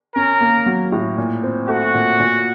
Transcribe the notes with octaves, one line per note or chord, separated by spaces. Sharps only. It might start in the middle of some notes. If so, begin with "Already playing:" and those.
C#4 A#4
A#3
F#3
A2
A#2
C4
A3 F#4
A#2
A#2